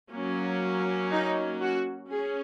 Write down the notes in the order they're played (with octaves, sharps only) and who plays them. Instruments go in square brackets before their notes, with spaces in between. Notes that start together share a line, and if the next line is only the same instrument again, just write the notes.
[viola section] F#3 A#3 C#4
D#4
F#4
C#4 G#4